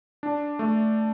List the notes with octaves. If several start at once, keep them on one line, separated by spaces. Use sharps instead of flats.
D4
A3